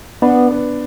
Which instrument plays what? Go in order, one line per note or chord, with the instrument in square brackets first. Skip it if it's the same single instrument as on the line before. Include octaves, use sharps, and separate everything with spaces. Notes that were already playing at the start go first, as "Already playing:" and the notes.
[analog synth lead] B3 [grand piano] D4
[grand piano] B3